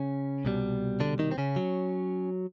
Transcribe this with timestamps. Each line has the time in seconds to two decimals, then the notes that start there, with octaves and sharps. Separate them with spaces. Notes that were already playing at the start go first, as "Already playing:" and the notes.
Already playing: C#3 C#4
0.45 C2 B2 G3
1.00 D3 D4
1.19 D#3 D#4
1.31 C4
1.38 C#3 C#4
1.56 F#3